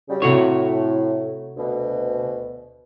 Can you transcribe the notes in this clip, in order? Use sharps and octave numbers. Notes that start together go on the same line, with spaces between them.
C#3 F#3 G3
A2 C3 F#4 C#5
D2 B2